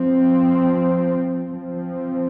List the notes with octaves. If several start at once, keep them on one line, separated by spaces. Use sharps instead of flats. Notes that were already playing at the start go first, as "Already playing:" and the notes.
Already playing: F3 C4
F3 C4